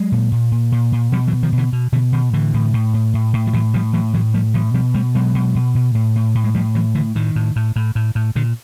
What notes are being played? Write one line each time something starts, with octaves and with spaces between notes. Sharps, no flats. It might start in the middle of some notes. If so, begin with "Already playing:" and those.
Already playing: F#3 G#3
A#2
A#2
A#2
A#2
A#2
B2 F3 G3
E3 F#3
B2
D#3 F3
B2
D3 E3
B2
B2 D3 E3
B2 D#3
A2 D3 E3
A2
A2
A2
A2
A2
F3
A2 E3 F#3
A2 F3 G3
A2 E3 F#3
A2 E3 F#3
A2 F3 G3
A2 E3 F#3
B2 F3 G3
B2 G3 A3
B2 F#3 G#3
B2
B2
B2
A2
A2
A2
G#3
A2 F3 G3
A2 E3 F#3
A2 D3 E3
A2 D#3
A2
A2
A2
A2
A2
A#2 D3